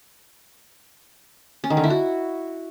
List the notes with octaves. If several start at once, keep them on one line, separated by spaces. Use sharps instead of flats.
C#4
D#3
D3
E4
F#4